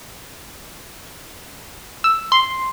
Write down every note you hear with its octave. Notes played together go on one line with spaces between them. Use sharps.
E6
C6